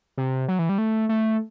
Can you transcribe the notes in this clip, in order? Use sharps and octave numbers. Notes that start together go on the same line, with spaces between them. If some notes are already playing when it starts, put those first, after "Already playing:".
C3
F#3
E3
G3
A3
A3